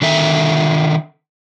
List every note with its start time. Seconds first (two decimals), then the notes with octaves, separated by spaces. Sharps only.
0.02 D3 D#3 A4 E5